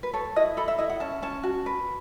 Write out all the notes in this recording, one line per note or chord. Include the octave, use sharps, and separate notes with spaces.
B4
A4 C#5
E4 D#5
A4 B5
E5
E4 D#5
F#5
C#4 A5
C#4 A5
F#4 A5
B4